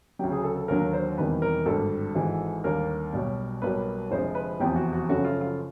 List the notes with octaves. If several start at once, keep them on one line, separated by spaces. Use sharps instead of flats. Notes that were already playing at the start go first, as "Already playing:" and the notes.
D2 C#3 F#3 G4
G#4
A4
A4
D#2 D3 F#3 A#4
C5
E1 E2 C3 D#3 G3 B4
A#4
G#1 G2 D3 G3 A4
G#1 G#2 E3 G#3
D#2 D3 G3 A#3 A#4
B1 B2 G3
B1 B2 G3 A#3 B4
F1 F2 D3 F3 G#3 C5
B4
F1 E2 C3 F3 G4
F#4
F#4
F#2 C#3 F3 A3 F#4
F4
F4